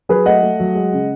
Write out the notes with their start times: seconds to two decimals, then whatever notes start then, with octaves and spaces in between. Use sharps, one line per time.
0.09 F#3 G#4 B4
0.26 A3 D#5 F#5
0.42 A3
0.60 F#3
0.75 G#3
0.93 C#3